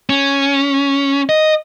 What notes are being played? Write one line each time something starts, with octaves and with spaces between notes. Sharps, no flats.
C#4
D#5